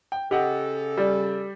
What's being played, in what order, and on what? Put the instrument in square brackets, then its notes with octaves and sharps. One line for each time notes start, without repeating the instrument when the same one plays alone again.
[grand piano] G5
[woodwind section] C#3 C#4 A4 [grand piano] G4 D#5 F#5
[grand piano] G3 D5